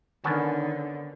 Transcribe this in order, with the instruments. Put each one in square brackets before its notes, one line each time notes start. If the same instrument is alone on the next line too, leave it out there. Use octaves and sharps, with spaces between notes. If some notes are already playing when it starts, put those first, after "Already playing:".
[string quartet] D3 [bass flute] D#3 [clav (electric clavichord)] B3 C#4 A5